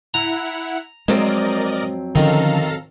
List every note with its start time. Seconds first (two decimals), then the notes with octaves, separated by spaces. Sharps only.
0.14 E4 F#5 A#5
1.08 F2 F#3 G#3 C4 A#4 D5 D#5
2.15 D3 D#3 F3 C#4 A4 F5 A#5